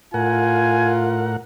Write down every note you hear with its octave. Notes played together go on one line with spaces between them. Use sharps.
A2 F4 A#4 F#5 G#5